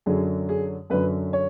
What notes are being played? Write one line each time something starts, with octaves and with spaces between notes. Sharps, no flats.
F#2 D3 F#3 G#4
G#4
F#2 D3 F#3 B4
C#5